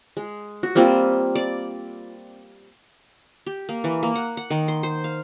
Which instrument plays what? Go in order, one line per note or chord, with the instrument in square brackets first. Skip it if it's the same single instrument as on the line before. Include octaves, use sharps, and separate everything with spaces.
[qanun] G#3
F#4
G3 A#3 C4 F4
D5
G4
A#3
E3
A#3
F#5
F#5
D#3
C6
C5
F5